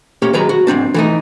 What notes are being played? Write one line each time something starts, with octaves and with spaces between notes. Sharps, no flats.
A#3 C#4 G4 C#5
D#3 F#3 G#3 B4 A#5
F#4
G#2 D3 C4 D4
E3 A3 D#4